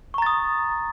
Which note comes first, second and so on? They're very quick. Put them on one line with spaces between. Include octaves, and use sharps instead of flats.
C#6 A#5 A6 D#6